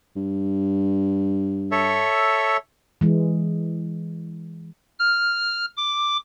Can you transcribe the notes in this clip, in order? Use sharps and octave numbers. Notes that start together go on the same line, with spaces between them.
G2
A4 C#5 E5
E3 G#3
F6
D6